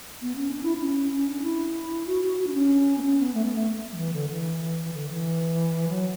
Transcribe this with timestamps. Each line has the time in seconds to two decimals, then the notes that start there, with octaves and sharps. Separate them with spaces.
0.22 B3
0.36 C#4
0.50 D4
0.63 E4
0.75 D4
0.79 C#4
1.11 C#4
1.27 D4
1.43 E4
2.07 F#4
2.23 F#4
2.39 F#4
2.47 D4
2.55 C#4
2.98 B3
3.03 C#4
3.19 B3
3.34 A3
3.45 B3
3.56 A3
3.93 F#3
3.98 E3
4.14 D3
4.30 E3
4.93 D3
5.10 E3
5.89 F#3